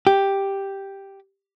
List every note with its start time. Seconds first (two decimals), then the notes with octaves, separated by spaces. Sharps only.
0.07 G4